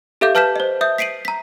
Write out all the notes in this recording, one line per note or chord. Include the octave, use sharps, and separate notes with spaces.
G4 A4 E5 F5 D6 G6
B4 A5 F6 G6 B6 E7
C5 D#5
E5 D#6 G6
B6 C7 D7 D#7 F#7
A#5 B6